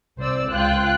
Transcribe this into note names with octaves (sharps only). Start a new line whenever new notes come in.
C2 C5 D5 E6
C#2 F4 G5 F#6